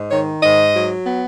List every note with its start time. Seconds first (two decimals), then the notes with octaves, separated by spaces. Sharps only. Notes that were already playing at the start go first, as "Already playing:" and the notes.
Already playing: G#2
0.11 D#3 C#5
0.43 G#2 D#5
0.75 F#3
1.06 B3